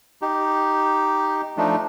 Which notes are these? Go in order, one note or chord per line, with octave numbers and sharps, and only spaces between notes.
D#4 G4
F3 A3 D4 D#4